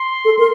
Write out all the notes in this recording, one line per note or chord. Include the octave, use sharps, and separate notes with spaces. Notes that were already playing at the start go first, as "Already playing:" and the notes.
Already playing: C6
A4
A#4